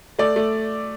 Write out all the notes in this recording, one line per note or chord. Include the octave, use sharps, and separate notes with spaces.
A3 D5
A3